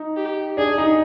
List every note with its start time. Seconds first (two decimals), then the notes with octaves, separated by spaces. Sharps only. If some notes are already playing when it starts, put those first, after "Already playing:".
Already playing: D#4
0.17 G4
0.57 D4 G#4
0.78 D#4